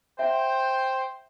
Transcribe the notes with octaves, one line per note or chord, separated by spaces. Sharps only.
C5 E5 F#5 G5